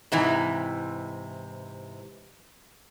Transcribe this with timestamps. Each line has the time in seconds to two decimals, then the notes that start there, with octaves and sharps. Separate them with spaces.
0.12 G#2 C3 E3